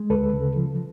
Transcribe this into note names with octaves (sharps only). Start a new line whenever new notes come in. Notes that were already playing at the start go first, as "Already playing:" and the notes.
Already playing: G#3
D2 A4 B4
C#3
F3